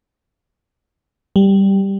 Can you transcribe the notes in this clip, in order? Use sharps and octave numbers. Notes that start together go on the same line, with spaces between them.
G3